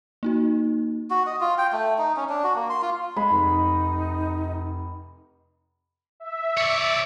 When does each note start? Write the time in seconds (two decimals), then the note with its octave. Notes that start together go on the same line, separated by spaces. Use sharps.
0.23 A#3 D#4 F#4
1.10 F#4
1.27 D#5
1.41 F4
1.58 G5
1.73 A3
1.98 D#4
2.16 C#4
2.29 D4
2.44 F#4
2.55 A#3
2.70 C6
2.82 F4
3.16 G#3 B5
3.30 F1 D#4
6.20 E5
6.57 C#5 D5